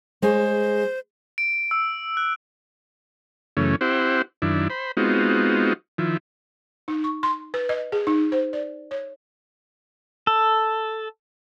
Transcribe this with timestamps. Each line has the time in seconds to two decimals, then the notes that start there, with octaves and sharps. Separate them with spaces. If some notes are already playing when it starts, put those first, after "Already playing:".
0.22 G#3 G#4 C5 C#5
1.38 D7
1.71 E6
2.17 F#6
3.57 F#2 C#3 E3 A3 C#4
3.81 C4 E4 G4 C5 F#5
4.42 F#2 D#3 D4 E4
4.70 C5 B5
4.97 G#3 B3 C4 D#4 F4 F#4
5.98 D#3 F3 E4
6.88 D#4
7.04 C#6
7.23 C6
7.54 B4
7.69 D#5
7.92 G#4
8.07 D#4
8.32 C5
8.53 D5
8.91 C#5
10.27 A4